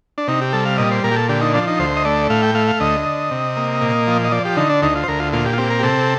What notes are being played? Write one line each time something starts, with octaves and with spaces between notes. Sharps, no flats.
D4
C3 D#4
G4
G3 A4
F5
A#2 D#5
C5
A#2 A#4
G4
A4
D3 G4
D#4
F3 D4
D#4
D2 C5
D#5
A3 D5
A2 F5
G5
A3 F5
F5
D2 D#5
D3
C3
A#3
A#2
F3
D#5
F3 D5
G4
D3 D#4
D4
D2 D#4
F4
C5
D2 A#4
F4
A#2 F4
G4
F4
C4 G4
A#4
G4
C3 A4